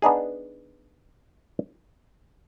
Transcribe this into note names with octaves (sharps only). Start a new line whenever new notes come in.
B3 D4 D#4 G#4